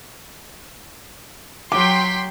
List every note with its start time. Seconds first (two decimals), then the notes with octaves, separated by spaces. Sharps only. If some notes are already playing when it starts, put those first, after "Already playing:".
1.72 F#3 G5 C6 D6 B6